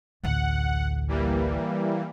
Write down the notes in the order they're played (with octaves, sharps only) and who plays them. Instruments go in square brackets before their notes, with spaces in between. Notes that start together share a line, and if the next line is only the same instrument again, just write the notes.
[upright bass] A1 D2 [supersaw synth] F#5
[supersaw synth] E3 G3 A#3